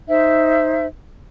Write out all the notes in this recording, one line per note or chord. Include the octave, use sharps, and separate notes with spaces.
D#4 C5 E5